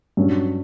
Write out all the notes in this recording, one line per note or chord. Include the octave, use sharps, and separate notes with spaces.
G2 F#3 C#4